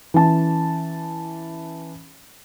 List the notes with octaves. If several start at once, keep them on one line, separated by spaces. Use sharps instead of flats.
E3 C#4 A5